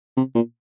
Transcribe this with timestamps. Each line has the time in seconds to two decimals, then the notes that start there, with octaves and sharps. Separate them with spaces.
0.17 C3
0.35 A#2